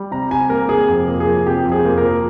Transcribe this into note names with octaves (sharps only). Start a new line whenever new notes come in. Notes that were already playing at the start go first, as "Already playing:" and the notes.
Already playing: G3
C3 A#5
C3 G#5
A#3 A#4
C3 G#4
F2
A#3
G#4
F3
C3 G4
F2
G#4
A#3
A#4
F3